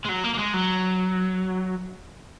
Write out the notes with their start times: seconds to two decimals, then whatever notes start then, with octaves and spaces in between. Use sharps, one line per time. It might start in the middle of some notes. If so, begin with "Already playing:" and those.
0.05 G#3
0.09 F#3
0.24 A#3
0.34 A#3
0.38 G#3
0.54 F#3